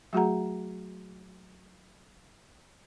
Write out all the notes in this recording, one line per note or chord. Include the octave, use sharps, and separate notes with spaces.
F#3 A3 F#4 G#4 F#5 A#5